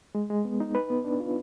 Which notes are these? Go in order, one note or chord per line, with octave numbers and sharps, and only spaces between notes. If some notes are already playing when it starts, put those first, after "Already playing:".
G#3
G#3
B3
D#4
B4
B3
D4
F4